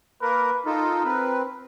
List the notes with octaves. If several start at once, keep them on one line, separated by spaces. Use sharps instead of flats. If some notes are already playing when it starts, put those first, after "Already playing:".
A#3 A#4 B4
D#4 F4 A4 A#4
C4 B4